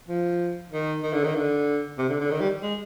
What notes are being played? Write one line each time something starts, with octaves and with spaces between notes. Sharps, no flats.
F3
D#3
D#3
D3
D#3
D3
C3
D3
D3
D#3
G3
G#3